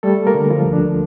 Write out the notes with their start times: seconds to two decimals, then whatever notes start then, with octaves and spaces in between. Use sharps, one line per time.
0.03 G3 A3 A4
0.27 A#3 A#4
0.34 D3
0.50 F3 F4
0.66 D2
0.73 D4